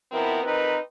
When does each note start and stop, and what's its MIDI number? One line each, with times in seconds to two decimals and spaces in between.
0.12 0.40 47
0.12 0.40 53
0.12 0.40 59
0.12 0.40 60
0.12 0.40 64
0.12 0.40 70
0.43 0.76 41
0.43 0.76 60
0.43 0.76 63
0.43 0.76 70
0.43 0.76 71